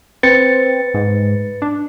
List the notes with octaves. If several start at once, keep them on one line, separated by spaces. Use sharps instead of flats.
C4 B4 A6 C#7
G#2
D4